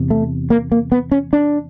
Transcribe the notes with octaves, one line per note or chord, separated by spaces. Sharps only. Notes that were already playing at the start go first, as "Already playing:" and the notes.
Already playing: E2 C3
A3
A#3
A#3
B3
C#4
D4